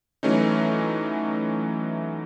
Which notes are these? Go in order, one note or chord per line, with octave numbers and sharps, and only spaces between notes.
E3 F#3 A3 C#4 D#4